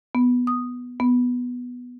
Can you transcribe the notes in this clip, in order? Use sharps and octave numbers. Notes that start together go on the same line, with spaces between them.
B3
D#6
B3